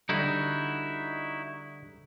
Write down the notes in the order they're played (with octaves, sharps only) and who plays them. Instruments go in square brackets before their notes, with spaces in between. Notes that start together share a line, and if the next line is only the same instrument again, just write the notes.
[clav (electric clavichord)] D3 G3 [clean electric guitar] D#4 E4 F#4